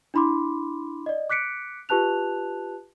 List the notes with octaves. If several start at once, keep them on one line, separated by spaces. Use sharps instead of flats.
D4 E4 B5 C6 D6
D5 D#5
D6 F#6 B6 C#7 D7
F4 G4 B4 A5 F#6 F7